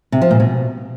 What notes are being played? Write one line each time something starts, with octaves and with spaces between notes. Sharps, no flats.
C3
F3
A#2
B2